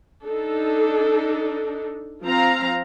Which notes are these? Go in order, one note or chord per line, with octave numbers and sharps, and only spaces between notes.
D4 D#4 A4
F3 C4 F5 A#5